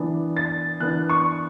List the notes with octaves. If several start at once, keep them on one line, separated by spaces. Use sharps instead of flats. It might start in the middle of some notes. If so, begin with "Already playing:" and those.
Already playing: E3 B3 D4
A6
E3 B3 D4 F#6
C#6